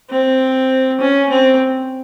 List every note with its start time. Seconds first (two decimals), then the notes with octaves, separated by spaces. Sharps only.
0.10 C4
1.00 C#4
1.29 C4